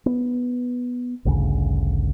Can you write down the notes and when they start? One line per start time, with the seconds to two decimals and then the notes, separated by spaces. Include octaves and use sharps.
0.06 B3
1.25 A1 D2 G2 C#3